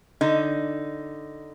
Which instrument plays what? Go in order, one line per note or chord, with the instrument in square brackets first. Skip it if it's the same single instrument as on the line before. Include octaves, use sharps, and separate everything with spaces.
[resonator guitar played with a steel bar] D3 D#4